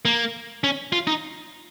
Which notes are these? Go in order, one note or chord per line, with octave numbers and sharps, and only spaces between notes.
A#3
C#4
F4
D#4